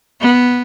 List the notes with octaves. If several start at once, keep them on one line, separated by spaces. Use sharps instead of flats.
B3